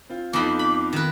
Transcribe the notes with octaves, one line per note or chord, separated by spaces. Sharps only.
C4 F4
F2 B3 D#4 F4 B5 D6
B5
D#3 B4